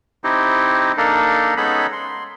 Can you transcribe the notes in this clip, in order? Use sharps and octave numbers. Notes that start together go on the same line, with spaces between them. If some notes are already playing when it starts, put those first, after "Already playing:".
C4 D#4 E4 G4
A#3 D4 D#4 A4 A#4
G#3 B3 C#4 D#4 A4 B5
C6